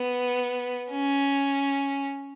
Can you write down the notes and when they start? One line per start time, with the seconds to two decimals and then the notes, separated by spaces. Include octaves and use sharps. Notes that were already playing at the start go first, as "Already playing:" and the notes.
Already playing: B3
0.90 C#4